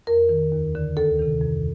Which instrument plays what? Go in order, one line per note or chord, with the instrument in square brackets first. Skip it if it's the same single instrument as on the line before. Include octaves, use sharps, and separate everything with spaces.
[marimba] F2 A#4
D#3
D#2
D3
D2 A4
C3 D#3
F2